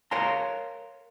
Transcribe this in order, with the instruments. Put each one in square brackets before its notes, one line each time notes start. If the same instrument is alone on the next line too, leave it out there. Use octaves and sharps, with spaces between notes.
[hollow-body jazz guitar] A#4 C#5 F5 A#5 C6